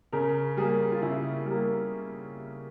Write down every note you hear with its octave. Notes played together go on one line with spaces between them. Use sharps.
C#3 A#4
G3 A#3 G#4
F4
C#3 E4
G3 A#3